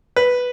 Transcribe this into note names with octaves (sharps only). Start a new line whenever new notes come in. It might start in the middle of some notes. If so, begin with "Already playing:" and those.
B4